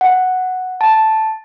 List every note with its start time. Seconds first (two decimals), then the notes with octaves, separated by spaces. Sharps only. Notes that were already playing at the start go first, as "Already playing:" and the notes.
0.01 F#5
0.81 A5